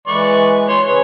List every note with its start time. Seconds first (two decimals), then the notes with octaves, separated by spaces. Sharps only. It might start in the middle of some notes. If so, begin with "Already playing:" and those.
0.07 E3 G#3 B4 D5 C#6
0.69 C#5 C6
0.87 C#3 G#4 B4 C#5